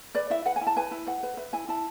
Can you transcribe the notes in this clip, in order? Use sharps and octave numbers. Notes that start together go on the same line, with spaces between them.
B4 D5
E4 E5
B4 F#5
G#5
E4
A5
B4 G#5
E4
B4 F#5
B4
B4 E5
E4 G#5
E4 A5